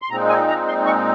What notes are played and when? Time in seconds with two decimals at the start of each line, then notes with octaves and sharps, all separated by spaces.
0.02 C6
0.10 A#2 G#3 C4 D#4 A#5
0.29 G#5
0.48 A#5
0.68 C6
0.86 C#6